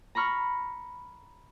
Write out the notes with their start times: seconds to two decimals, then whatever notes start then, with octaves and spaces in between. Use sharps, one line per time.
0.15 A#5 B5 C#6 F6